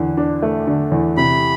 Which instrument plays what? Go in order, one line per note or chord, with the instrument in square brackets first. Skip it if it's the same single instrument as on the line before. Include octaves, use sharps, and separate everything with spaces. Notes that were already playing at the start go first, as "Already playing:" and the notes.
Already playing: [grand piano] E2 D3
D4
A3
D3
E2
[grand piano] C3 [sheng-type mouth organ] B5